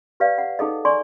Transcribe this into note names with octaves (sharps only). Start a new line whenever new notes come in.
G4 B4 D5 F5
F#5
D#4 G#4 A4 D#5
D5 G#5 C6 C#6